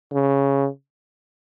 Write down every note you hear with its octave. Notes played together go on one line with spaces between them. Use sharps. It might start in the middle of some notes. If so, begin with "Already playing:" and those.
C#3